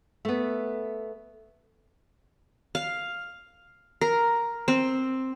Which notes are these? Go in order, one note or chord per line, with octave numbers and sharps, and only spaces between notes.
A3 B3
F5
A#4
C4